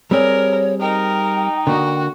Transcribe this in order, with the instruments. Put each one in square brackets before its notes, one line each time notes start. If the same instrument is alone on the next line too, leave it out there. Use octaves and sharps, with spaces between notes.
[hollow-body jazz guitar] G3 C4 G#4 [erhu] A#4 [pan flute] C#5
[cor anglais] D#4 [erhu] A#4 [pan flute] G5
[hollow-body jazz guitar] D3 A#3 [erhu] F#4